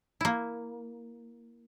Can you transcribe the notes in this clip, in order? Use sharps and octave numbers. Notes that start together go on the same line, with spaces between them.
A#3 E4